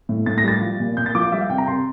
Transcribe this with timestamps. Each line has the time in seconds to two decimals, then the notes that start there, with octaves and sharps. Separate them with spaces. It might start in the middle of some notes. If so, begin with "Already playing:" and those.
0.09 A2
0.26 A2 A6
0.38 A#6
0.44 G3 A6
0.61 F3
0.80 A#2
0.97 A#2 G6
1.06 A6
1.15 F3 D6
1.23 F5
1.32 G3 E5
1.41 F5
1.50 C3 G5
1.58 A#5
1.68 C3 C6